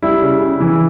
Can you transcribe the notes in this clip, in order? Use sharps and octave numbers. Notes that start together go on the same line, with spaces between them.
G3 E4
C#3
C#3
E3